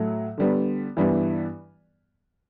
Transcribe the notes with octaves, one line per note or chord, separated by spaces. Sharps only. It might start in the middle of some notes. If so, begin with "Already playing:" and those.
Already playing: A2 F#3 A3
D3 G3 B3
G2 E3 G3 B3